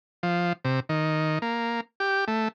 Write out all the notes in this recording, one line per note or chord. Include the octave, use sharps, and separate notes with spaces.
F3
C3
D#3
A#3
G4
A3